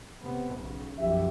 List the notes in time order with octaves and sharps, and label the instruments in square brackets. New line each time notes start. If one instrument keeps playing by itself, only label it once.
[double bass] C3 B3
B1 C#3
[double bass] B1 F#2 [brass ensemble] F3 G4 E5